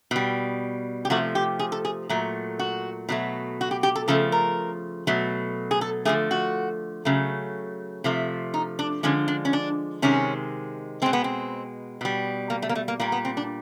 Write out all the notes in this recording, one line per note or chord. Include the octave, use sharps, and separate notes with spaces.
B2 G3
G4
C3 F3 A3 F#4
G4
G#4
A4
G#4
A#2 F#3 A3
F#4
B2 F#3 A3
F#4
G4
G4
A4
C#3 F3 A3 A4
A#4
B2 F#3 A3
G#4
A4
D3 F3 A3 G#4
F#4
C#3 F#3 A3
C3 F3 A3
D#4
D4
D3 F3 G#3 C#4
D4
C#4
D4
C3 D#3 G#3 C#4
B2 G#3 C4
B3
C4
B2 G3
A#3
A3
A#3
A3
A#3
A#2 G3 A#3
B3
C4
D4